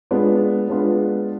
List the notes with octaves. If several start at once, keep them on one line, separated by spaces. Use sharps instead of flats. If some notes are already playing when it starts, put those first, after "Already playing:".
G#3 B3 D4 F4
G#3 B3 D4 F4